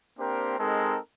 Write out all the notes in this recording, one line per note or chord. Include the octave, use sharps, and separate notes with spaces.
A#3 C4 D4 G4 A#4 C5
G#3 C4 D#4 A4 A#4